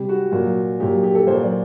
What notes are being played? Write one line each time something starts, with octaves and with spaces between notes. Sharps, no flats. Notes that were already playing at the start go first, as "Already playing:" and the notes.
Already playing: C3 G3 G4
F#4
A#2 F#3 F#4
A#2 F#3 G4
G4
A4
A#2 F#3 C5
D5